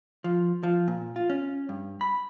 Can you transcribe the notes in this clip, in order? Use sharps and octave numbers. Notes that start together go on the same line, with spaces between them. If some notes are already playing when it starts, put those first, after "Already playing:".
F3
F3
A#2
F4
C#4
G2
B5